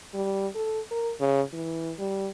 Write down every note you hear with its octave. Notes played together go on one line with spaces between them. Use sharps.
G3
A4
A#4
C#3
E3
G3